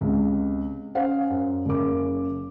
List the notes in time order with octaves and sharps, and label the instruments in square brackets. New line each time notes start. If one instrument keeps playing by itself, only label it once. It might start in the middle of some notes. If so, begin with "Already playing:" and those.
[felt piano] C#2 C3
C#4 C5 F5 F#5
F#2
F#1 C#3 A#4 D6